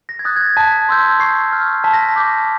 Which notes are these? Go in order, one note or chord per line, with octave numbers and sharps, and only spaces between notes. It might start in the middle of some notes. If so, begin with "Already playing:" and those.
A#6
G#6
D#6 F#6 A6
G#6
A6
A5 B6
C6 E6 G6
C#6 C7
F6
A5 B6
A#6
B6
D6 G6